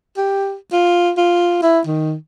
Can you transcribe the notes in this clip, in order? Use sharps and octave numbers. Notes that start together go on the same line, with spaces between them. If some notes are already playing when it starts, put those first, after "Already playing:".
G4
F4
F4
E4
D#3